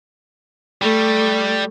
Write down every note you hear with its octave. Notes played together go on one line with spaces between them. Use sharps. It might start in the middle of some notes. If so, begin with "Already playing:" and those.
G3 A3